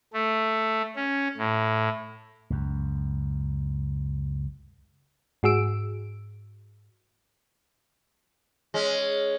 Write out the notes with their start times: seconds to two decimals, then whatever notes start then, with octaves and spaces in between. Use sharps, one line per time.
0.13 A3
0.96 C#4
1.37 A2
2.50 C#2 F#2
5.43 G#2 F#4 G#4 E6 D7
8.74 G#3 C#4